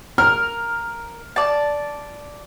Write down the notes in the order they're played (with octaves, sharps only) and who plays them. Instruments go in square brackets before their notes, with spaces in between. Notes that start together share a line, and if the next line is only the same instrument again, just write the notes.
[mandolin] A#4 [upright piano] F6
[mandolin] D5 A5